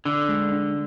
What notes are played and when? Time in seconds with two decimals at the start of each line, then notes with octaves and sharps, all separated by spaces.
0.05 D3 D4
0.29 G#3
0.52 D4